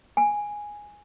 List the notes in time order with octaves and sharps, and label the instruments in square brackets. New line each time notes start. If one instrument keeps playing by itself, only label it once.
[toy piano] G#5